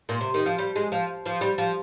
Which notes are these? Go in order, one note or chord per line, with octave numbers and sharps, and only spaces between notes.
A#2
C3
D#3
F3
G3
G#3
F3
F3
G3
F3